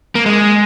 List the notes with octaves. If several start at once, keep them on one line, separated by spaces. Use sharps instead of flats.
A#3
G#3